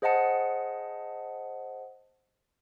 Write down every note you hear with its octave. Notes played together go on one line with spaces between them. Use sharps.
G#4 C5 D#5 F#5 A5 C#7